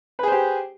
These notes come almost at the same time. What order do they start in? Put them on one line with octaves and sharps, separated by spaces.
B4 G#4 C5 G4